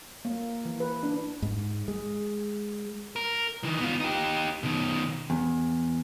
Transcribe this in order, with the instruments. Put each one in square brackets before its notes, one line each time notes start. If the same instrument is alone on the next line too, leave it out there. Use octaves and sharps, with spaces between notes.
[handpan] A#3
E3
B4
D4
[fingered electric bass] G#2
G#3
[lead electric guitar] A#4
D#3 E3
B3 F4
D#4 G4
B2 D#3
[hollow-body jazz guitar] E2